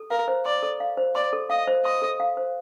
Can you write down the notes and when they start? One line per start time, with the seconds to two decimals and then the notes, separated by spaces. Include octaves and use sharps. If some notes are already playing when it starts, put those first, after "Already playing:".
Already playing: A4
0.10 A#4 F5
0.28 C5
0.45 D5 C6
0.63 A4
0.80 F5
0.97 C5
1.15 D5 C6
1.33 A4
1.50 D#5 F5
1.67 C5
1.85 D#5 C6
2.02 A4
2.20 F5
2.37 C5